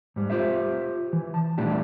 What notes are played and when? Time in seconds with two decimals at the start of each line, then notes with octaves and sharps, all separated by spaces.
0.16 G#2 G3
0.30 F4 G4 C5 E5
1.13 E3
1.34 A5
1.58 A#2 E3 G3 A3 D4 G4